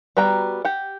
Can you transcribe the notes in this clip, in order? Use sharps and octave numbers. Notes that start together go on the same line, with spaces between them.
G3 B3 F#4 G5 A#5
G4 F#5